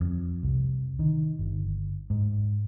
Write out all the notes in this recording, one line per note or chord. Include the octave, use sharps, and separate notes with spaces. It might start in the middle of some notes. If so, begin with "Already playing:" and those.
F2
C2
D#3
G1
G#2